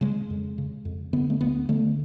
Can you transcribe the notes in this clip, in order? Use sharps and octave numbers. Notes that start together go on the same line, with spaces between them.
C#3 G#3
F2
C#3
F2
D3 B3
A3
D2 B3
D3 A3